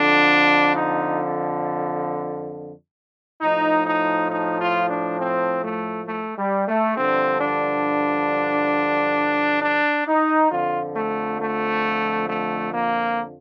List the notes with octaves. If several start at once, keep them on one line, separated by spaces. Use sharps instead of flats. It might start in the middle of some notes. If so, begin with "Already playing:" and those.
Already playing: F2 D3 F3 D4
D#4
A2 F3 D#4
D#4
D#4
F4
D4
C4
A3
A3
G3
A3
G2 D3 F3 C4
D4
D4
D#4
F2 D3 F3 F4
A3
A3
A3
A#3